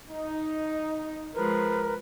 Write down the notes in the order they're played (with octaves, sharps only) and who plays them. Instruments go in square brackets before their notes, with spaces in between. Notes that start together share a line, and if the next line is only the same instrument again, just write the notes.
[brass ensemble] D#4
[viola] F3 G#3 [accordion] A#4 [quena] B4